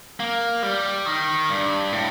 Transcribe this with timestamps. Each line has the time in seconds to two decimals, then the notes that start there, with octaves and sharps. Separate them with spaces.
0.20 A#3
0.63 G3
1.06 D#3
1.50 G2
1.92 A2